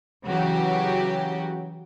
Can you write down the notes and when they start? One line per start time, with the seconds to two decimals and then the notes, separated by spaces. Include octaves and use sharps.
0.25 C#3 E3 F#3 F#4 G4